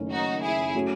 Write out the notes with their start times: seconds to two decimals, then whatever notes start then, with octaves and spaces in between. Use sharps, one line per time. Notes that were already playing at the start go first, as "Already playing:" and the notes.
Already playing: F#1 F#2 D#3 A3 C#4
0.12 D#4 F#4
0.43 E4 G#4
0.75 F#3 A3 C#4 F#4